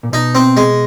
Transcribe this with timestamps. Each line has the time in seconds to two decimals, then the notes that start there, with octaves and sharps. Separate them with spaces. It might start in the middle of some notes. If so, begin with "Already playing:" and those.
0.03 A#2
0.12 B2 D#4
0.35 C4
0.57 G#3